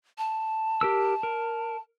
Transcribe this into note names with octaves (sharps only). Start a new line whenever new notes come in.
A5
G4 A#4 E6
A#4